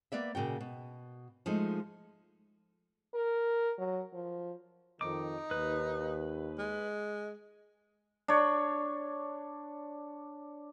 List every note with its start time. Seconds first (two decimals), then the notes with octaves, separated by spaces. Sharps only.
0.12 A#3 B3 D5 E5
0.35 A#2 C#3 F#4 G5
0.61 B2
1.46 F3 G#3 A3 D#4
3.14 A#4
3.79 F#3
4.14 F3
5.01 F2 D#3 D#4 D6
5.51 D#2 B4
6.59 G#3
8.28 D4 C#5